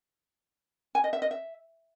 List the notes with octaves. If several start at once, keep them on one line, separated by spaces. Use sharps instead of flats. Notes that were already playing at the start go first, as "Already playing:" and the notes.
G#5
D#5
E5
D#5
E5